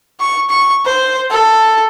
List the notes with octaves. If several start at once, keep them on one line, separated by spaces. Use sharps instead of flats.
C#6
C#6
C5
A4